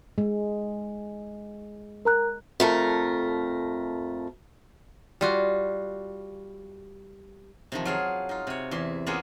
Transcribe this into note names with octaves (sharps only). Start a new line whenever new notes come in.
G#3
A#4 A#5 F#6
F2 A3 A#4
G3 F4 F#4
C3 D#3 F3
F#3 F4 G#4
D#4 F4
C3 C#5
E2 E4 C6
A#3 B3 C#4 F4 F#4 G#4